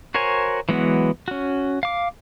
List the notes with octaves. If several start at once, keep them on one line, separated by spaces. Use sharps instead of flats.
F#4 A#4 C5 C#5 G#5
E3 F#3 G#3 B3 F#4
C#4 F#4
F5 D6